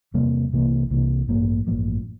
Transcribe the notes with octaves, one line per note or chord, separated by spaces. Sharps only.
E2 C3 G3 A#3
C2 C3 E3 A#3
C2 C3 E3 A#3
A1 G2 F3 A#3
A1 G2 F3 A#3